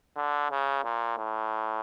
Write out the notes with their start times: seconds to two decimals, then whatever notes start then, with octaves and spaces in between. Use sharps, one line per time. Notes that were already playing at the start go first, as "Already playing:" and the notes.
0.16 D3
0.51 C#3
0.84 A#2
1.18 A2